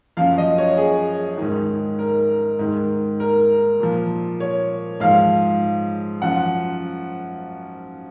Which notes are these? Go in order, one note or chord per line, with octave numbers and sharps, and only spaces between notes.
F#2 F3 F5
D#5
C#5
G#4
G#2 D#3
A#4
G#2 D#3
A#4
A#2 F3
C#5
G#2 F3 F5
F#2 F3 F#5